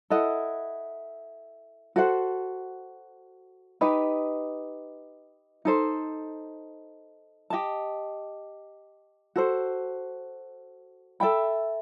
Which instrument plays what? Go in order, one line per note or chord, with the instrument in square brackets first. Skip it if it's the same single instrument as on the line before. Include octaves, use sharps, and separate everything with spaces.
[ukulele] E4 A4 D#5 F#5
F#4 A4 C5 F#5
D#4 G4 B4 D#5
D#4 A4 C5
G4 D#5 A5
F#4 A4 C5
A4 E5 G5 B5